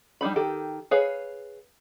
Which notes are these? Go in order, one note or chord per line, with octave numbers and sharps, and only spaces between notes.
G3 D4 D#4 B5
D#3 G4 A4
G#4 B4 C#5 F5